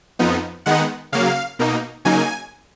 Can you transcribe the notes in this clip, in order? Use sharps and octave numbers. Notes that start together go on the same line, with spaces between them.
F2 F3 B3 D#4
D#3 G#3 B3 D#4 F#5
C#3 F#3 A#3 F5
B2 A#3 D#4
C#3 F#3 A#3 D#4 G#5